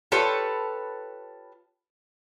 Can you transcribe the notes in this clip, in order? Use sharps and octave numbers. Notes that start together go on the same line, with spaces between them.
F4 G4 A4 B4 C#5